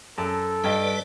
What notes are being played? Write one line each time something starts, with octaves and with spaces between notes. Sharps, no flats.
F#2 A4 A5
G2 G3 B4 D5 D#5